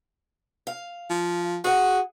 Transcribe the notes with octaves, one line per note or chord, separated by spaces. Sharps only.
F5
F3
F#4 G#4 F#5